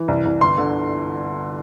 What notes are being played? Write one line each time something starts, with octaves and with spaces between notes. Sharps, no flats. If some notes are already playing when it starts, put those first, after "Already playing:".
Already playing: E3
C2
C2
G1 C6
D3